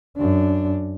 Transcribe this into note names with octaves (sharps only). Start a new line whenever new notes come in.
F#2 D4